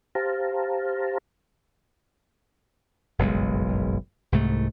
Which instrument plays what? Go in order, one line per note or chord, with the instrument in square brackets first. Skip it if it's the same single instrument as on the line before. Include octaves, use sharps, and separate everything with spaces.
[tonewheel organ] G4 C5 F5 A5 A#5
[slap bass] F#1 B1 G2 G#3
C2 G#2 A3